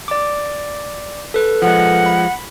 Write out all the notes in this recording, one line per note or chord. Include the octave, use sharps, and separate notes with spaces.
D5 D6
A4 B4
F3 G#3 F#5
B5